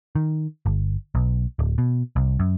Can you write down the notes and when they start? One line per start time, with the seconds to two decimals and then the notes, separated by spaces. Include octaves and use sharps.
0.15 D#3
0.66 G1
1.15 B1
1.59 D1
1.78 B2
2.16 C2
2.39 F#2